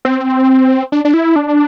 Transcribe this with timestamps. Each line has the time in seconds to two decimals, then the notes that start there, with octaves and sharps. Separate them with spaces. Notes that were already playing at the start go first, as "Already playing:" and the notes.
0.05 C4
0.92 D4
1.05 D4
1.14 E4
1.36 D4